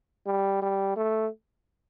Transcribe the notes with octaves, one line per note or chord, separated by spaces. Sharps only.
G3
G3
A3